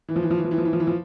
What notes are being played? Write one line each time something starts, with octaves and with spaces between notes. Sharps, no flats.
E3
F3
E3
F3
E3
F3
E3
F3
E3
F3
E3
F3